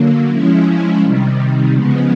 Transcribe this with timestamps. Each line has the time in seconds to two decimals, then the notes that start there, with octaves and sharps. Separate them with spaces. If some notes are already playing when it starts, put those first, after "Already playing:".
Already playing: D3 F#3 A#3
0.29 F3 G#3 C#4 E4
1.00 C3 D#3 G3
1.72 C#3 F3 G#3 B3